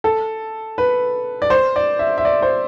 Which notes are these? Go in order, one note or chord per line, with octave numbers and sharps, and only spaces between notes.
A4
B4
D5
C5
D5
E5
E5
D5
C5